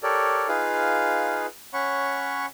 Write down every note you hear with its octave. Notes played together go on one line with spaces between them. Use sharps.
G4 A4 A#4 C#5 D5
D#4 F4 G#4 B4 F5
C#4 C#5 F#5 B5 C#6